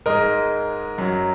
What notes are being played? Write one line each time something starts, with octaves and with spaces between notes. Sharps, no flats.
G#2 G#3 A#4 D#5
F#2 F#3